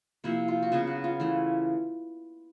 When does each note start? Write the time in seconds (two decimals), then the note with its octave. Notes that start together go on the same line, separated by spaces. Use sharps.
0.24 C3 F3 A#3 E4
0.48 F4
0.62 F#4
0.72 C#3 F#3 B3 F4
0.87 F#4
1.04 F4
1.20 E3 A3